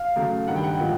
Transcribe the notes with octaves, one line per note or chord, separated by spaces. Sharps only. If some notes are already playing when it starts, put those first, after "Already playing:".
Already playing: F5
C#3 F#3 A3
G2 D#3 G3 F#5
G5
F#5
A#2 F3 G#3